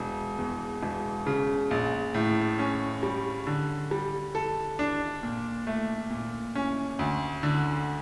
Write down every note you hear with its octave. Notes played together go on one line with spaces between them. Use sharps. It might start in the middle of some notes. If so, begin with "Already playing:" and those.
Already playing: E1
E2
E1
C#3
A#1
A2
C#4
G3
D3
G3
A4
D4
A#2
A3
A#2
C#4
D2
D3